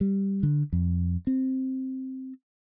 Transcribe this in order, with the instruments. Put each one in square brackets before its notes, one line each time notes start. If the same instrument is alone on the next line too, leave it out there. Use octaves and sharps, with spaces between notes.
[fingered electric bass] G3
D3
F2
C4